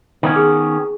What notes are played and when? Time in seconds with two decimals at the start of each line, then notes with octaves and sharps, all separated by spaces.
0.23 D#3 B3 C#4
0.36 G#4